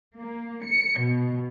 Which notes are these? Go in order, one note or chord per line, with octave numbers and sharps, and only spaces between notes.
A#3
C#7
B2